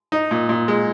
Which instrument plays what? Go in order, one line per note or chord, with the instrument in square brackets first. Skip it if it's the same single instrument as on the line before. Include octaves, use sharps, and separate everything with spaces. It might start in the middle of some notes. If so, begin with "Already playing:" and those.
[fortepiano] D#4
A#2
A#2
G#3